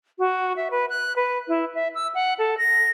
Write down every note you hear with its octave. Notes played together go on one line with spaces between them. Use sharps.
F#4
E5
B4
F#6
B4
E4
E5
E6
F#5
A4
A#6